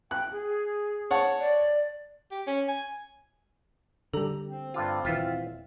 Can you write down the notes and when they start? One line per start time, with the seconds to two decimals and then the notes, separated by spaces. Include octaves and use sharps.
0.11 G5 F#6
0.31 G#4
1.11 C#5 F#5 A5
1.40 D5
2.32 G4
2.47 C#4
2.68 G#5
4.14 D3 G3 A4 A#5
4.48 C4
4.74 G2 D3 F4
5.05 D#1 E3 F4 E5 F#5